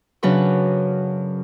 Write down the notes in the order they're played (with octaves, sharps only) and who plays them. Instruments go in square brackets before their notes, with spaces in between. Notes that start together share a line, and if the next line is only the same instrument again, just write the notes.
[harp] F#2 C#3 F#3 D4 B4 C#6